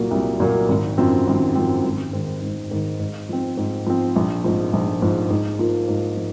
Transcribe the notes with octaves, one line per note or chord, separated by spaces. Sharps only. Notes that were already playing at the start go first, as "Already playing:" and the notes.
Already playing: C2 A#2 F#3 A#3
C2
A#2 F#3 A#3
G#1
F#2 F3 C4
G#1
F#2 F3 C4
G#1
G#2 D#3
G#1
G#2 D#3
G#2
F3 C4
G#2
F3 C4
A#1
G#2 F3
A#1
G#2 F3
G#2
F3 A#3 F4
G#2
F3